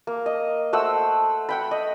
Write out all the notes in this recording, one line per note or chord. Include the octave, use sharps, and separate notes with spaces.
A#3
D#5
A3 C5 F#5 E6
F#5 G5 B5
D#5